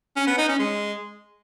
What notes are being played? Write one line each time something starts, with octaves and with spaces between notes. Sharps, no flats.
C#4
B3
D#4
C#4
G#3